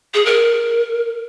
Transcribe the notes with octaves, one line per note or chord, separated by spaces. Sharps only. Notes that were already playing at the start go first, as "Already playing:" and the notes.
G#4
A#4